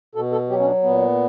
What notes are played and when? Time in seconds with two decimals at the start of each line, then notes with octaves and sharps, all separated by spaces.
0.15 B2 A4
0.32 A4
0.49 F#3 G4
0.59 C#4
0.66 D4
0.83 A#2 B3